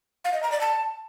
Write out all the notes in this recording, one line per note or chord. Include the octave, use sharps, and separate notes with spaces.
F5
D#5
A#5
D5
A5